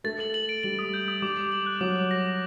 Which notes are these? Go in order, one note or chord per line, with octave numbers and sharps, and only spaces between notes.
A3 A6
F#7
F#7
D7
G3 F#7
D#6
G6
D#6
G3 D6
D6
F#7
F#6
F#3 D6
D6
A#6
D6